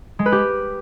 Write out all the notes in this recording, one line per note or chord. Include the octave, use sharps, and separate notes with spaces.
G#3
B4
G4